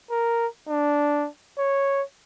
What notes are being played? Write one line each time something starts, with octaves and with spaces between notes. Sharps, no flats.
A#4
D4
C#5